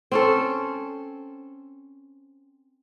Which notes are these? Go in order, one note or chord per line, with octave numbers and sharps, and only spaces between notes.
C4 C#4 A4